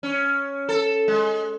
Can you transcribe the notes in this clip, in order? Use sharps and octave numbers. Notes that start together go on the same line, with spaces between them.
C#4
A4
G#3